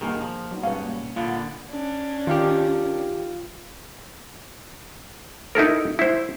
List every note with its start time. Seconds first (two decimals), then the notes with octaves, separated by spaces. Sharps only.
0.01 G2 B2 D#3 A#3 G#4 A#4
0.21 F3
0.51 F#3 B3 D#4
0.63 G2 B2 G#3 C#4 B4 F5
0.84 A#3
1.16 A#2 D3 B3 F4
1.70 C#4 D4
2.27 D#3 F4 G4 F5
5.55 D#4 E4 A4 A#4
5.99 E4 C5